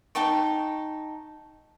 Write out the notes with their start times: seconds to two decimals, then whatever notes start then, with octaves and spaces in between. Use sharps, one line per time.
0.15 D#4 G5 A5 C#6